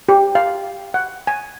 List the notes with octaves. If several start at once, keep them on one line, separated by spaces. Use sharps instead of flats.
G4
F5
F#5
G#5